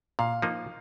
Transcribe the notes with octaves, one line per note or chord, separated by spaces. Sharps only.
A#2 F5
F3 A#3 D#4